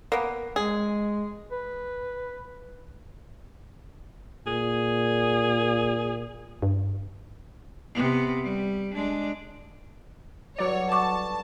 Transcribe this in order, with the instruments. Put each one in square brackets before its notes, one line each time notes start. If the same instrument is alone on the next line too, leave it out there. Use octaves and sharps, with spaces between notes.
[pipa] A#3 B3
[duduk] G#3 [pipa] G#4
[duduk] B4
[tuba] A#2 [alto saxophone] G#4
[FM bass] G2
[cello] C3 B3
G3
G#3 D4
[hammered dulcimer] G2 F#4 A4 [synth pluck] F#3 D5 [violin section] C#5
[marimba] F#5 C#6 D6 [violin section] A5